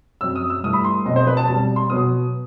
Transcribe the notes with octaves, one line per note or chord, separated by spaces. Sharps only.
F#2 F#3 C4 E6
D#6
E6
G2 E3 A3 D#6
B5
C6
B2 F#3 C4 D#5
C5
B4
A5
B2 G3 C4 A5
C6
B2 F#3 B3 D#6